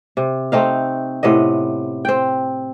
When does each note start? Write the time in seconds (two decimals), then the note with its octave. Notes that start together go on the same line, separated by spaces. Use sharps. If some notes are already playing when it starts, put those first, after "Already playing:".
0.17 C3
0.52 A3 C4 D#4 F5
1.23 A2 C3 B3 D#5
2.05 C4 G5